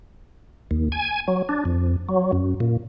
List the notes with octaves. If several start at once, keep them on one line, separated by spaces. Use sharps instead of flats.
D#2
G#5
F#3
D4
F2
F#3
F#2
A#2